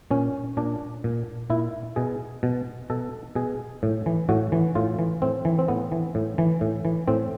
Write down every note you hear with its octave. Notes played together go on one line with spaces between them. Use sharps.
A#2 C#4
A#2 D4
A#2
A#2 E4
B2 G#4
B2
B2 A4
B2 G#4
A2
E3
A2 F#4
E3
A2 F4
E3
A2 C4
E3
C4
A2 B3
E3
A2
E3
A2
E3
A2 C4